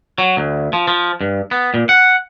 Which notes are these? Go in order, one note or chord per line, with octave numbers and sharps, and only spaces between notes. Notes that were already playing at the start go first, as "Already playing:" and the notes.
F#3
D2
F3
F3
G2
B3
A#2
F#5